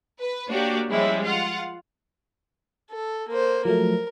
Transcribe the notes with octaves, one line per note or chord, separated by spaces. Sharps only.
B4
A#3 D4 F#4 G4 C#5 D5
F3 G3 G#3 C#4 E4
F4 F5 F#5
A4
A#3 C5
F3 F#3 A3 A#4